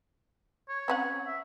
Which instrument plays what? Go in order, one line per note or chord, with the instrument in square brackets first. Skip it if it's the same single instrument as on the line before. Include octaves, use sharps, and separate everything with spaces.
[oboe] C#5
[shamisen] C4 C#4 F#5
[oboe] E5